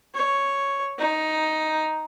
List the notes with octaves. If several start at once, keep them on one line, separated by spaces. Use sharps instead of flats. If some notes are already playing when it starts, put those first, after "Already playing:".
C#5
D#4